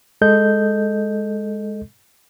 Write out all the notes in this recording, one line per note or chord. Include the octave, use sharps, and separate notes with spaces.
G#3 A4 D#5 G6